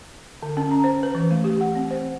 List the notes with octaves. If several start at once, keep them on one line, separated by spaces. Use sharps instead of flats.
D3
C#4
A#5
C5
B4
E3
A3
G4
F#5
C4
C5